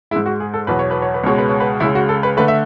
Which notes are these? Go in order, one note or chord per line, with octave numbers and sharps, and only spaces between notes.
G#2 G#3 E4
F#4
G#4
A4
E2 B2 F#3 B4
C#5
B4
C#5
B4
C#2 B2 G#3 C#5
B4
C#5
B4
C#2 C#3 G#3 E4
F#4
A4
B4
D3 A3 B4
E5